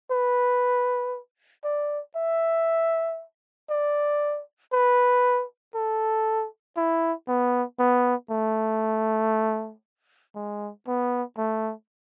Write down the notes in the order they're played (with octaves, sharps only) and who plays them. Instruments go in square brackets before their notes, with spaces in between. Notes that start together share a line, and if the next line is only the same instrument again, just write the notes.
[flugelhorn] B4
D5
E5
D5
B4
A4
E4
B3
B3
A3
G#3
B3
A3